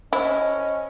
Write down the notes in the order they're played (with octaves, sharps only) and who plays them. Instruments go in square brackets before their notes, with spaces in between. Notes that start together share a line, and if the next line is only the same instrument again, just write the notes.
[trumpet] C#4 [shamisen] E4 [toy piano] A#4 C5 A5 [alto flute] D#5